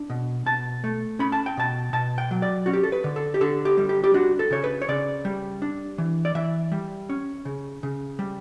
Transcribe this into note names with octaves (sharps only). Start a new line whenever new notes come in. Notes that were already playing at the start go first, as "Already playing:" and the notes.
Already playing: D4
B2
B2 A5
A3
C#4 B5
A5
G5
B2 A5
B2 A5
G5
F#3
D5
C#4 F#4
G4
A4
B4
D3
A4
G4
D3 A4
G4
G3
G4
G4
D4 F#4
A4
C#3 C#5
B4
C#5
C#3 D5
G3
D4
E3
D5
E3 E5
G3
C#4
C#3
C#3
G3